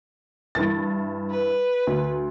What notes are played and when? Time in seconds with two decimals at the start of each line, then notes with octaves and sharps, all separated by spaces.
0.55 G2 E3 A6
1.30 B4
1.87 D2